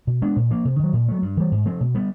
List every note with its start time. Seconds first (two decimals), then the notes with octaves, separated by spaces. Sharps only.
0.07 B2
0.22 G#3 B3 D4
0.36 A#2
0.51 F3 A#3
0.65 C3
0.79 D#3 F#3
0.93 A#2
1.08 F#3 A3
1.22 G2
1.37 E3 G3
1.52 G#2
1.66 F3 A3 C4
1.80 B2
1.94 G3 B3